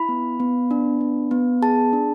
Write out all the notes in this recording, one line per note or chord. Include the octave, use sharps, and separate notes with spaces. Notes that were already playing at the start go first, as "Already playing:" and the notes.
Already playing: E4 B5
B3
B3
D4
B3
B3
G#4 A5
D4